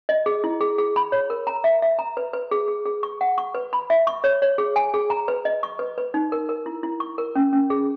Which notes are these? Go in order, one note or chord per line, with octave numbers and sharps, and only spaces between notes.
D#5
G#4
E4
G#4
G#4
B5
C#5
A#4
A#5
E5
E5
A#5
B4
B4
G#4
G#4
G#4
C#6
F#5
C#6
B4
B5
E5
C#6
C#5
C#5
G#4
G#5
G#4
A#5
B4
D#5
C#6
B4
B4
D#4
A#4
A#4
E4
E4
C#6
A#4
C#4
C#4
G#4